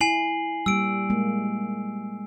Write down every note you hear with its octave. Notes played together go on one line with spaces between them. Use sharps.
E4 G#5 C7 F#7
G3 A#3 E6 D7
G#3 A#3